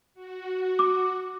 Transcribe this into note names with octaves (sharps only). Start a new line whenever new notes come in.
F#4
D6